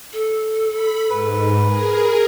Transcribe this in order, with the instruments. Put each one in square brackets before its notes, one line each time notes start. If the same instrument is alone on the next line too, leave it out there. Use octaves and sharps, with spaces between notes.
[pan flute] A4
[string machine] B5
[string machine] G#2 [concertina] B4
[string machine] G#4 A#4